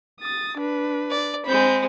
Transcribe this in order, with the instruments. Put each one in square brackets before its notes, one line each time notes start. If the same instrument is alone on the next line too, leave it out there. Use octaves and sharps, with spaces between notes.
[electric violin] D#6 A6
D4 B4
[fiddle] D5
[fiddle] G#3 C4 [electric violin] B5 G6